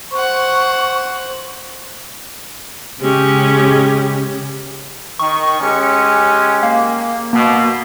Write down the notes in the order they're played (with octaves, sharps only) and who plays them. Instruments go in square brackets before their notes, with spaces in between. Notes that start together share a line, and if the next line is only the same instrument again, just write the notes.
[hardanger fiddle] C5 F#5 [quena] C#6
[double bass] C#3 [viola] G#3 C#4 [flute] G4
[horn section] D#3 [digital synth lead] C#6
[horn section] G#3 C#4 G4 [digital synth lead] C#7
[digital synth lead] A#3
[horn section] B2 [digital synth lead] A#3